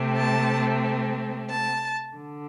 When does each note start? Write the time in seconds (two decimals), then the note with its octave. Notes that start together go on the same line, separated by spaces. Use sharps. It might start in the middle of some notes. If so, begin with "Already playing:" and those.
Already playing: C3 A3 C4
0.17 A5
1.50 A5
2.17 D3